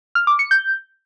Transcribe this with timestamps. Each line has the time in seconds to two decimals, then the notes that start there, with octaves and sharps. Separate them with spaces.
0.15 F6
0.27 D6
0.39 C#7
0.51 G6